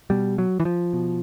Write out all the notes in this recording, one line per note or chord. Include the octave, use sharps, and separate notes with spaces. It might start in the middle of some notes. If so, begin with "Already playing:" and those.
B2 G3
F#3
E3
F3
B2